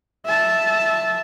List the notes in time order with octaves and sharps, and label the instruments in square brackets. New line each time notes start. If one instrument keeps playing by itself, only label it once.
[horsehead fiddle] E5 A5